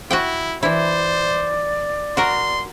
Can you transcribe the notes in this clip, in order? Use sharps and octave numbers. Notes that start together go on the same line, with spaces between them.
E4 F#4 F#5 G5
E3 E4 C5 D5
F#4 A#4 C6